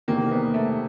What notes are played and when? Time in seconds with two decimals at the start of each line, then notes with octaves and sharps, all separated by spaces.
0.08 E2 C3 D#3 A#3
0.31 B3
0.54 A3